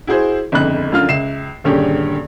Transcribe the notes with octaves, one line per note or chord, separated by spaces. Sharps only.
E4 F#4 G#4 C5
G1 F2 C#3 D#4 B5 F#6
F#2 D3 F4 F5 F6
C#2 E5 C7 E7
D#1 G2 D3 C#4 G4 G#4